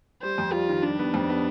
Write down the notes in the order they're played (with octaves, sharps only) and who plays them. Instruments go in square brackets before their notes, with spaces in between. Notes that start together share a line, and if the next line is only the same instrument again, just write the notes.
[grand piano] G3 [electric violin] C5
[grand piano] F2
[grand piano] G3 [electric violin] F4
[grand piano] D#3
[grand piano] G3 [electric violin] D4
[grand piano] B3
F2
B3